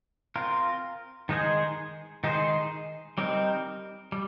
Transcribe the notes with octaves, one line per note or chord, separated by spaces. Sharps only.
C4 F4 A#4
D#3 G#3 D#4 G#4 C5
D#3 G#3 D#4 G#4 C5
G3 C4 D#4 A#4
G3